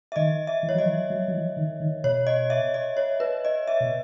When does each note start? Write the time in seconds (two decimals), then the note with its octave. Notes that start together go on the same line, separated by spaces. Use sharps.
0.12 E5
0.16 D#3 D#5
0.47 E5
0.63 E3
0.69 C#5
0.74 F#3 D#5
0.85 E3
1.10 F#3
1.28 F#3
1.33 E3
1.57 D#3
1.80 D#3
2.04 B2 C#5
2.27 D#5
2.50 E5
2.74 D#5
2.97 C#5
3.20 B4
3.45 D#5
3.68 E5
3.80 B2